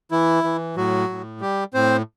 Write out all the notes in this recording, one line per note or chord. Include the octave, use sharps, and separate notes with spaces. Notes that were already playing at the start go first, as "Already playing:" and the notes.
E3 E4
E3
A2 F#3 F#4
A2
G3 G4
A2 C4 C5